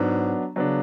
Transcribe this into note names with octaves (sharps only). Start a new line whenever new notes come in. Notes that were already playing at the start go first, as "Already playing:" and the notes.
Already playing: G#2 F#3 B3 D4
C#3 F#3 B3 D4